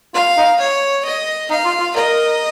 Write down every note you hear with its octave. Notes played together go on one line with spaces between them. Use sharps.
F4 F5
D#4
C#5
D#5
D#4 F5
F4
F4
A#4 D#5